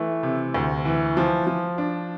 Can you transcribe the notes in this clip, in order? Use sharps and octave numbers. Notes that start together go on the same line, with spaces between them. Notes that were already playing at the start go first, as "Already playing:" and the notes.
Already playing: E3 A3
C3
D2
E3
F3
F3
D4